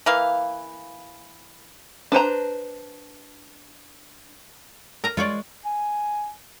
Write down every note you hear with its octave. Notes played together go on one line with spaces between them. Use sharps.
E3 A#3 F5
D4 B4 C5 A#5
A#4 A#5
G#3 F4 C#5 D5
G#5